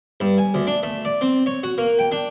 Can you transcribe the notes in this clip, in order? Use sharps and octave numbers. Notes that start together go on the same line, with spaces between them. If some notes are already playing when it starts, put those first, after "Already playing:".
G2
G#5
D2
D4
A3
D5
C4
C#5
F#4
A#3
G5
D4